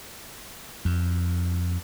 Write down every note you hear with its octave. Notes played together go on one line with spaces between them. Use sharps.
F2